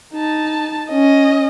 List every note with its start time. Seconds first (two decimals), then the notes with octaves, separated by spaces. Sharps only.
0.14 D#4 A5
0.90 C#4 D#5